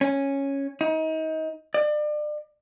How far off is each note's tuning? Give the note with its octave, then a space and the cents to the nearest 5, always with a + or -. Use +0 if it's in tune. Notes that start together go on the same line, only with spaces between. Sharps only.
C#4 -5
D#4 +30
D5 +35